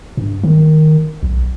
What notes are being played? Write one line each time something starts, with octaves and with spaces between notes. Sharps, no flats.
G2
D#3
B1